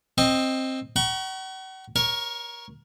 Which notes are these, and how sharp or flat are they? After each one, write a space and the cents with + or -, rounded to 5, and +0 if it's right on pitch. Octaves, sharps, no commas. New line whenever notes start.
C4 +10 D#5 +0 C#6 -40
F#5 +45 A#5 +45 C#6 +0
A#4 +20 C#5 +0